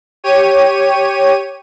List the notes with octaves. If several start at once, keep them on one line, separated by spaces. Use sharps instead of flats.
G4 C#5 D#7